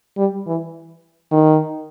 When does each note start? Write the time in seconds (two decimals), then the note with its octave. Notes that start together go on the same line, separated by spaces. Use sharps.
0.18 G3
0.47 E3
1.32 D#3